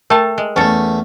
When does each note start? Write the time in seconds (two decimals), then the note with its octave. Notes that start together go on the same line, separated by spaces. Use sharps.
0.10 A3 A#4 G5 A5 B5
0.38 G#3
0.56 E2 A3 C#4 A4